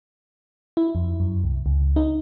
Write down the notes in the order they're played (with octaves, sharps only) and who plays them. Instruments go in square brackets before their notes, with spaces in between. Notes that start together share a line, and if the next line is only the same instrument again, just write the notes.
[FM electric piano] E4
F2
F#2
C2
C#2
D#4